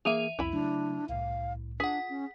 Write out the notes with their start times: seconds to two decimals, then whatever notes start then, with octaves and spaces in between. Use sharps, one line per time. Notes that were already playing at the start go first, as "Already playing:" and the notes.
0.05 E3 A#3 G#4 E5 D#7 F7
0.39 C2 F2 E4 B5
0.53 C#3 F#3 A3 D4
1.09 C2 A2 F5
1.80 D4 F4 G#4 F#5 B6
2.09 C#4